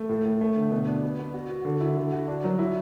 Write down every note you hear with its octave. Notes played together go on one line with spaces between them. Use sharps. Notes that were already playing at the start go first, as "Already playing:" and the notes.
Already playing: A3
A2
A2
A3
D3
B2
D4
B3
B3
F#4
F#4
D3
E4
D3
F#4
D4
F#3
E4